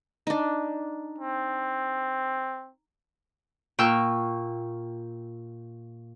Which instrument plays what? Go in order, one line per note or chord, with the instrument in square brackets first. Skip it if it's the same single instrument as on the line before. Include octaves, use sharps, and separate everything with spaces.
[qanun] D4 D#4
[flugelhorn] C4
[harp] A#2 G5 C#6 E6 F6